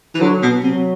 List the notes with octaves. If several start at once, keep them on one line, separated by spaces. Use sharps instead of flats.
E3
D3 F#3
B2
C3 F#3